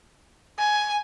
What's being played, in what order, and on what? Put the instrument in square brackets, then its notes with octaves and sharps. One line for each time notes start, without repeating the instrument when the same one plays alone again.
[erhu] G#5